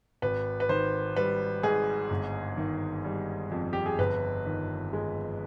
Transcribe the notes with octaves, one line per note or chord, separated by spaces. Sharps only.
G#1 B4
B4
D#3 C5
G3 B4
G#2 G#4
G1
D#3
G3
F2
G4
G#4
G1 B4
D#3
G#3